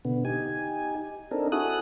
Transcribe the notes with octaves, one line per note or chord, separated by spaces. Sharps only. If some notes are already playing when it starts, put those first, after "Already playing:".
B2 D3 B3
D#4 G4 G#5
C4 D4 D#4 A4 A#4
E4 F#4 G#4 A4 D#6 F#6